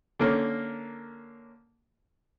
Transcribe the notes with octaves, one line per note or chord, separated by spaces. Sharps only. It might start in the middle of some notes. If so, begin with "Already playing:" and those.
D3 A#3 C#4